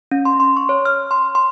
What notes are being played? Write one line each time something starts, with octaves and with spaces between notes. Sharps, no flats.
C#4
C6
C6
C#6
C#5
F6
C6
C6